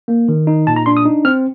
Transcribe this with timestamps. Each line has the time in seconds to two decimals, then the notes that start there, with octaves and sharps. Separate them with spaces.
0.08 A#3
0.28 D#3
0.47 D#4
0.67 A#2 A5
0.76 A#5
0.86 D4 C6
0.97 D#6
1.05 D#4
1.25 C4 F6